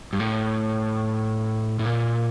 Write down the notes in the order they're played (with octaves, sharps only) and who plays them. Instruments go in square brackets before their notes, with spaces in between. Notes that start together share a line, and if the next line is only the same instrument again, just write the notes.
[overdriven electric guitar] G2
A2
A2
A#2